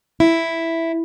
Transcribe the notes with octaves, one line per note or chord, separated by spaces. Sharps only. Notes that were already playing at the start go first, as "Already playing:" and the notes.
E4